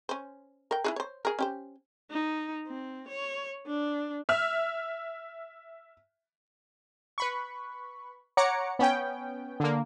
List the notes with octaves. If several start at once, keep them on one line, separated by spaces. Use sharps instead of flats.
C#4 C5
A#4 G5
E4 F#4 G#4
C5 C#5
G#4 A#4
C#4 G4 C5
D#4
C4
C#5
D4
E5 F6
B4 B5 C#6
C#5 F#5 A#5 D6 C#7
B3 C#4 G5
D3 A#3